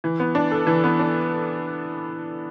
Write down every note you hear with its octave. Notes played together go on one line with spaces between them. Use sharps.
E3
B3
D4
A4
E3
B3
D4